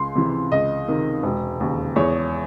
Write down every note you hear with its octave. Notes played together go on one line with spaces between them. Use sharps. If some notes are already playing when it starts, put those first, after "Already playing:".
Already playing: C#2 C6
C3 E3
C#2 D#5
C3 D#3
E1
D#2 C#3
E2 C#5